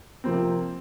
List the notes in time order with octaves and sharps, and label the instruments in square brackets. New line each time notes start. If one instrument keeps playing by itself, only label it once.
[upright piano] C3 F3 A#3 [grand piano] C4